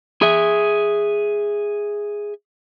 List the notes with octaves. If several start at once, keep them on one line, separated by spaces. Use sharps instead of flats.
G#4 E5